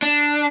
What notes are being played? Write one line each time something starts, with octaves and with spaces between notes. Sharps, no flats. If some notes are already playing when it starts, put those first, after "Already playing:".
D4